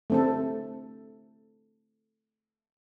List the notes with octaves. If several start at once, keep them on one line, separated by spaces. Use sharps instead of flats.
A3 C4 A4